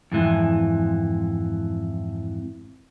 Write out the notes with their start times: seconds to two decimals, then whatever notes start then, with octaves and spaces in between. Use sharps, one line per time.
0.12 F2 G#2 E3